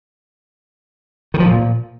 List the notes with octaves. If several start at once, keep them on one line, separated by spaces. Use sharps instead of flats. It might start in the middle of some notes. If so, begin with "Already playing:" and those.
D#3
F3
A#2